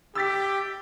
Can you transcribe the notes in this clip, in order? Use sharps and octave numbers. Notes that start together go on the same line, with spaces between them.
G4 E6 A6 B6